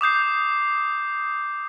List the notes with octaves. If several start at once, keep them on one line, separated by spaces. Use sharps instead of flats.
D6 D#6 G6 C7